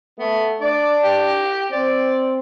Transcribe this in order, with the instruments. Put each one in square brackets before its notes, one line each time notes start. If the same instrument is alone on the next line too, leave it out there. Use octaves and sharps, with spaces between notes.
[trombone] A3 [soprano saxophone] B3
[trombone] D4 [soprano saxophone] D5
[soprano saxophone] G4
[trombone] C4 [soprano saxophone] D5